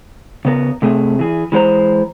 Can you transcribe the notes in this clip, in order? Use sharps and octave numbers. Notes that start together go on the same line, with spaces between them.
C#3 B3 A#4
C3 A3 G#4
E3 G#4
E3 G#3 A4 C5 A#5